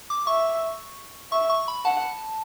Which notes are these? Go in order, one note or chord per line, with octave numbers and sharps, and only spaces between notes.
D6
E5 C#6
E5 C#6
C#6
B5
F#5 A5